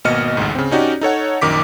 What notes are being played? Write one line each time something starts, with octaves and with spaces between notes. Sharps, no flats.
G#1 B2 A#3 D#5 F6 C#7
A1 D2 G#2
C#3 C4
C#4 D#4 F#4 G4 D5
D#4 A4 C#5 F#5
A#1 F#2 D#3 D6 B6